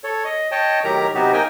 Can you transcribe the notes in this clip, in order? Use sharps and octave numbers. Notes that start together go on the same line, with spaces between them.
A4 C#5
D#5
C#5 D#5 G5 A5
A2 D#3 F#3 G4 A#4 A#5
C3 F#3 B3 D#4 F#4 G4
A#3 D#4 A#4 D#5 G5 G#5